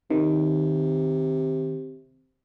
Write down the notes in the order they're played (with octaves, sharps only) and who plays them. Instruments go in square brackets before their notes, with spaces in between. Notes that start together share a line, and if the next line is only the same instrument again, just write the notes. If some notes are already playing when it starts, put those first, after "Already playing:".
[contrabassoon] C3 [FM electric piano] D#3